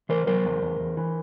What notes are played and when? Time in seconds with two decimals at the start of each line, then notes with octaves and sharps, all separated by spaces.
0.09 E3 A#4 C5
0.27 F#3 A#4 C5
0.44 E2
0.62 E2
0.80 E2
0.97 E3